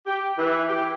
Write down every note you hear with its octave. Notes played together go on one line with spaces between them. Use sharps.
G4
E3
G4